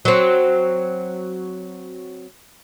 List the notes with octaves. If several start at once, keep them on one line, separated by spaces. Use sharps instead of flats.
F#3 C4